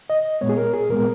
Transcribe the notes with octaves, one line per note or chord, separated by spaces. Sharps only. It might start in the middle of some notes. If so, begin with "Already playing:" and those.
D#5
A#2 G#3 B3 C#5
G#4
A#4
G#4
A#2 G#3 B3 A#4